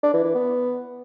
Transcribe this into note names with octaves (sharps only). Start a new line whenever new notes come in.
D4
E3
E3
B3